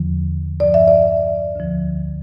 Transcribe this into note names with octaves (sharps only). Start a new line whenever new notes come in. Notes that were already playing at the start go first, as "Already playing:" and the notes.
Already playing: E2 D3 F3
G2 F3 D5
E5
D5
D2 D3 F3